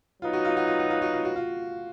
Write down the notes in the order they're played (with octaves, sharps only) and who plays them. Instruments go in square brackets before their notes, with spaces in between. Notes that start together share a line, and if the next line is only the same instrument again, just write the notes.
[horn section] F#3 B3 D#4 [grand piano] F4
[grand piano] F#4
F4
F#4
F4
F#4
F4
F#4
F4
F#4
F4